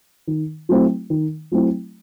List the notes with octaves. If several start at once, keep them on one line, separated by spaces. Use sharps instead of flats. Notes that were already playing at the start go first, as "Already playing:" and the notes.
D#3
F#3 A3 C4 E4
D#3
F#3 A3 C4 E4